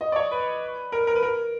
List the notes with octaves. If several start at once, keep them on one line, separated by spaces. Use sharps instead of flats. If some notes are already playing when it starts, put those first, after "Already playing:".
D#5
D5
C#5
B4
A#4
A#4
B4
A#4